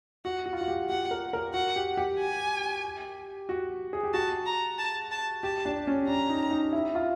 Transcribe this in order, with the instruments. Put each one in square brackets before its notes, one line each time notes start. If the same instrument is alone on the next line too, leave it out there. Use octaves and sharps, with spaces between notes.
[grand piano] F#4 [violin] F#5
[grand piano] F#4
F4
[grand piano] F#4 [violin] F#5
[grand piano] G4
[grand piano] G4 [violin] F#5
[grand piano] A#4
A#4
[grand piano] F#4 [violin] F#5
[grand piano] G4
G4
[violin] G#5
[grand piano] F#4
G#4
G4
[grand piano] F#4 [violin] A5
[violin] A#5
A5
A5
[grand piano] G4 [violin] A5
[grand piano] D4
C#4
[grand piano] D4 [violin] A#5
[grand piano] D#4
D#4
E4
F4